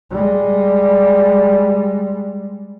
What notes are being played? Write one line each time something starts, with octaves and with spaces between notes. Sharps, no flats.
G3 G#3